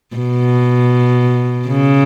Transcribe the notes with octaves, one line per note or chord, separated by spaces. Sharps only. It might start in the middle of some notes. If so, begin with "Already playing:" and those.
B2
C#3